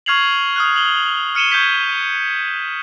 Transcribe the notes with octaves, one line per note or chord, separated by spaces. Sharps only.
C#6 F6 G#6 C7 F7 F#7
D#6 F6 F#6
F6 F#7 G7
F6 C#7 D#7 E7 G7
C#6 G6 G#6 B6